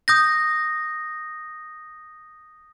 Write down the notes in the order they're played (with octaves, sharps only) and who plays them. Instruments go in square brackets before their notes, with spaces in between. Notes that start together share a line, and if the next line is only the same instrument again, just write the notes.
[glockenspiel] D#6 G6 A#6